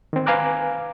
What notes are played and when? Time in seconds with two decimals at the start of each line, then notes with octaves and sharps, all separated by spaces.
0.13 D#3 C4
0.26 B4 F5 G#5 A#5 D6 F#6